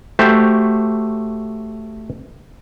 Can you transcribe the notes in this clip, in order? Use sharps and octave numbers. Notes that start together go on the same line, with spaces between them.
A3 F#4 G4 C5